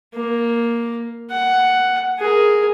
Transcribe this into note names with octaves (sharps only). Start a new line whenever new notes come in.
A#3
F#5
G#4 A#4